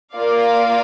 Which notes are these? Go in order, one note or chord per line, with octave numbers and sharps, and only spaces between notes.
A#3 F4 A#4 D5 F5